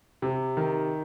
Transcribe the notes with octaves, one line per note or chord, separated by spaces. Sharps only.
C3
D#3